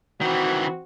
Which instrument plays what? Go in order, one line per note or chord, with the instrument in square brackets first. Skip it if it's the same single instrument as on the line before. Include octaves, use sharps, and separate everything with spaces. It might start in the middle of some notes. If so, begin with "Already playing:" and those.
[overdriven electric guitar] D#3 E3 [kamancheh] C4 F#4